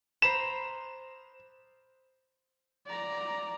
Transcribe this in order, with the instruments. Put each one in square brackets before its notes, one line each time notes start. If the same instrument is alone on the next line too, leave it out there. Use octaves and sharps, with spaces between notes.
[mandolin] C5 A#5 B5 [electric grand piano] E7
[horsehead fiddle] D5 A#5